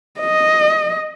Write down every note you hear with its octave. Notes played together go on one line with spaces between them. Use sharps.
D#5